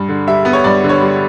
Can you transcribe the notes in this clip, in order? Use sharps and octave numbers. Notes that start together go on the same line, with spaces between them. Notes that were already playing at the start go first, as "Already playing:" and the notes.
Already playing: G2
D3
G3 E5
B3
C#5
G2 D5
D3
C#5
G3